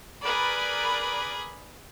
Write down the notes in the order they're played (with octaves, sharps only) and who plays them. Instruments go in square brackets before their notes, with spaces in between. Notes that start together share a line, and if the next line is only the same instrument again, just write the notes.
[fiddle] G#4 B5 [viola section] A#4 B4 D5